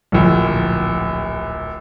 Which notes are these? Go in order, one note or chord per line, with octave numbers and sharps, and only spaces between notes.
D1 A#1